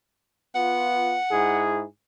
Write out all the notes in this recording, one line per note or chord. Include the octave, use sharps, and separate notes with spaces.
B3 F4 F#5
G#2 E4 G#4